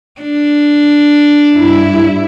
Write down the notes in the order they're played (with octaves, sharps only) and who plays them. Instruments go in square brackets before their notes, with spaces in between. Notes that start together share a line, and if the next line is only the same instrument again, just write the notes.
[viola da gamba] D4
[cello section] G2 E4